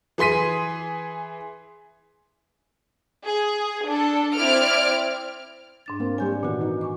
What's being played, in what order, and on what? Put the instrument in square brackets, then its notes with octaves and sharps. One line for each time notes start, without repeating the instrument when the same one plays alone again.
[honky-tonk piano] E3 G#4 C6 B6 D#7
[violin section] G#4
D4 A4
C4 E4 D5 F6 D7
[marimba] G#2 D4 A6
[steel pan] A#3 C4
[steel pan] G3 C#5 [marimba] G#5 G6
[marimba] A#2 F#4 [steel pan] D#3 E3 B3
[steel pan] D#4
[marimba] G#5 C#6 D6